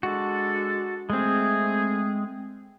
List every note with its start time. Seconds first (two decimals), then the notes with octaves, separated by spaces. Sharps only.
0.03 G#3 D4 F#4 A4
1.10 G#3 A3 C4 G#4